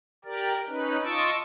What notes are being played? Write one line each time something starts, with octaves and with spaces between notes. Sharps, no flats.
G4 A#4 D5
C#4 D#4 B4
F4 D#5 A5 C#6 D6 E6